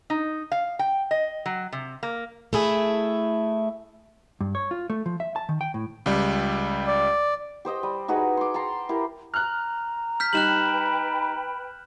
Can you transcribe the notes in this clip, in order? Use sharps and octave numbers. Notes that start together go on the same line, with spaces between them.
D#4
F5
G5
D#5
F#3
C3
A#3
A3 E4 G#4 E5
G2
C#5
F4
A3
F3
E5
A5
D#3
G5
A2
C#2 G3
D5
G4 C5 D#5 G5
G3
D#4 F#4 G#4 B4
C6 D6
G5 A5 A#5 C6
E4 G4 A#4
A#5 F6 F#6
F6 G6 B6
G3 D#4 B4 G5 B5 F#6 E7 F#7